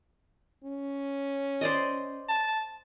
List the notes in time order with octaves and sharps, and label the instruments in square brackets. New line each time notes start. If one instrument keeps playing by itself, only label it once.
[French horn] C#4
[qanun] C5 D5 D#5
[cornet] A5